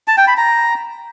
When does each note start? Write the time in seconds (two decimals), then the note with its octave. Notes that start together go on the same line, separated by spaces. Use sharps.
0.08 A5
0.18 G5
0.28 B5
0.37 A#5